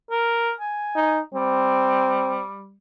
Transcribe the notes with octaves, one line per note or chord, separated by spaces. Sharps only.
A#4
G#5
D#4
G3 C4